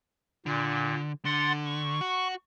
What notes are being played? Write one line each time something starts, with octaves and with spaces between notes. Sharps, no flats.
A#2 D3
D3 F#5 C6 A6
C#6
F#4